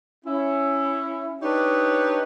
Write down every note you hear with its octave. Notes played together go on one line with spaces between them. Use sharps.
C#4 E4
D4 D#4 G4 B4 C#5 D#5